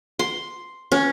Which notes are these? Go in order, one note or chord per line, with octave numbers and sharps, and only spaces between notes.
C6
C#4